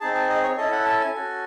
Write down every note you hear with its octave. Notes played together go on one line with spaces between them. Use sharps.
C4 D#4 G#4 A5
A5
D#5
C#5
C#4 E4 A4 D#5
F#5
A5
G#5
C#4 F#4 A4